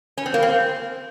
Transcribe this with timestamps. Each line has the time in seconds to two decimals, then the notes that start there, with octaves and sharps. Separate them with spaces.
0.17 C#4
0.26 C4
0.34 A#3
0.43 C4